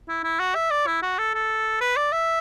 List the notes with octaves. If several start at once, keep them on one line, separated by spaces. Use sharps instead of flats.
E4
E4
F#4
E5
D5
E4
F#4
A4
A4
B4
D5
E5